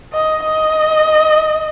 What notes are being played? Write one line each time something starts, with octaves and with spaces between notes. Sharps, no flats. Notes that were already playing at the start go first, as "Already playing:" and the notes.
D#5
D#5